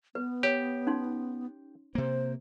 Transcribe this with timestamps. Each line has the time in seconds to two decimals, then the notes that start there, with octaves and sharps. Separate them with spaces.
0.15 B3 B4
0.43 G4 C#5
0.87 C#4 D#4 C6
1.95 C3 A#3 C5